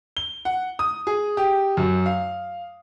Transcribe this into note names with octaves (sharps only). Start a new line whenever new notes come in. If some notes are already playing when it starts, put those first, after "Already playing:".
G7
F#5
D#6
G#4
G4
F#2
F5